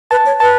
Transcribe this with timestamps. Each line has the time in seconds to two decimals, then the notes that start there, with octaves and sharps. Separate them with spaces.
0.11 B4 A5
0.26 C#5
0.40 B4 A5